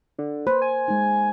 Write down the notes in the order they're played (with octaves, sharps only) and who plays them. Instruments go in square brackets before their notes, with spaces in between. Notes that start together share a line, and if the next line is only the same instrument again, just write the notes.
[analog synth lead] D3
[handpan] A#3 C5 [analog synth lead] B4
[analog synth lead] G#5
[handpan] G#3 D#4